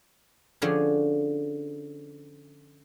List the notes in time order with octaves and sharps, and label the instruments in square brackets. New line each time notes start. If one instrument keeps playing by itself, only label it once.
[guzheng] D3 F3 C#4 G#4